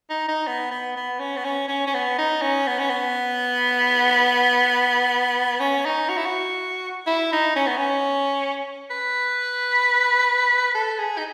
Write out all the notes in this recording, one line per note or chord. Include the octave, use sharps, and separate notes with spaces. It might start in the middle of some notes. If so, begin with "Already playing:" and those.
D#4
D#4
B3
B3
B3
C#4
B3
C#4
C#4
C#4
B3
D#4
C#4
B3
C#4
B3
C#4
D#4
F#4
E4
F#4
E4
D#4
C#4
B3
C#4
B4
A4
G#4
D#4